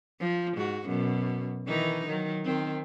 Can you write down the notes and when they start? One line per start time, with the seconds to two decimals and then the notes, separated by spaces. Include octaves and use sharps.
0.20 F3
0.57 G#2 F#4
0.87 F#2 B2
1.67 D#3 E3 D#4
2.07 D#3 F#3
2.45 D#3 C4